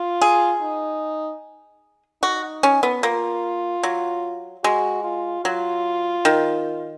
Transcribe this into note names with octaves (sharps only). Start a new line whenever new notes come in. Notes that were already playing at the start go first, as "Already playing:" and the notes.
Already playing: F4
G#4
D#4
D#4 F#4
C#4
B3
A#3 F4
F#3
G#3 F#4
F4
F#3 F4
D#3